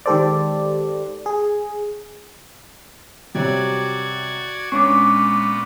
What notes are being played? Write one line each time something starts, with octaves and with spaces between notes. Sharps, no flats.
D#3 G#3 G4 A4 C5 D5
G#4
C3 F#3 G3 F#4 D5 G#6
A#2 G#3 B3 C#4 D4 C#6 D6